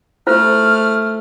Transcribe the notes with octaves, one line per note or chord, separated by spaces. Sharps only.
A3 E4 F4 C5 F6